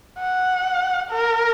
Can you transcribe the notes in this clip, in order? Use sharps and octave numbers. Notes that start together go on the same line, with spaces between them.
F#5
A#4